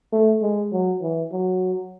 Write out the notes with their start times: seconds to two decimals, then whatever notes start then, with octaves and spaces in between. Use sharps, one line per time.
0.13 A3
0.42 G#3
0.72 F#3
1.02 E3
1.32 F#3